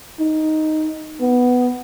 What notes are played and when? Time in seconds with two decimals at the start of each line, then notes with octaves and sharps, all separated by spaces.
0.19 D#4
1.20 B3